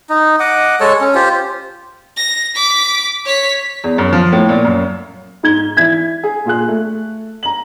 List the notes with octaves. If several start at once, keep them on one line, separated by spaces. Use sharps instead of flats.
D#4
D#5 F#5 D6
G#3 A4 C#5 A5
C#4
F4 G4 C5
A#6
D6 B6
C#5 B6
E2
F#2
F3
A2
A#2
F#2
G#2 D#4 G#6 G7
E3 E4 G#6 B6
G#4
A#2 F4 G#4 F#6
A3
A#5 F#7